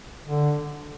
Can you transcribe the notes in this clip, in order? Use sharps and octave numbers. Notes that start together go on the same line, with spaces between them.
D3